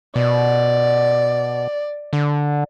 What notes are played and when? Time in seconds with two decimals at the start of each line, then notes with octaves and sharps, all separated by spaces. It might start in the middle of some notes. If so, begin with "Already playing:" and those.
0.16 B2 D5
2.13 D3